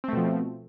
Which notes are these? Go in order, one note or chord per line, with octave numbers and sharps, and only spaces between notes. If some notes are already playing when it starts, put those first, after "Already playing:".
B2 F3 A3 C4